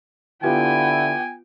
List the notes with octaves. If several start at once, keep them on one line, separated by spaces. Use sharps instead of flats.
D3 B3 E4 F4 G4 G5 G#5